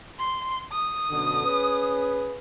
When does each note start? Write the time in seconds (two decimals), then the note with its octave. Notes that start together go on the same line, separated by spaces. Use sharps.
0.19 C6
0.71 D#6
1.11 F#2 B2 D3
1.45 C#4 G#4 B4